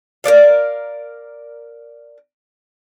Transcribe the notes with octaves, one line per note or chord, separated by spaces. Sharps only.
A#4 B4 D5 F5